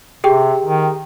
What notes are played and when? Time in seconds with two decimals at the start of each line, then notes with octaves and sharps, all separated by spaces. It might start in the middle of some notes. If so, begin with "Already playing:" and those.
0.24 C3 G4 G#4 G5
0.65 D#3